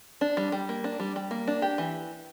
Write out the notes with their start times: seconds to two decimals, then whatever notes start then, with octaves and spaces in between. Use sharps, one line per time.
0.21 D4
0.37 G3
0.52 G3
0.69 A#3
0.84 D4
1.00 G3
1.16 G3
1.31 A#3
1.47 D4
1.62 G4
1.78 E3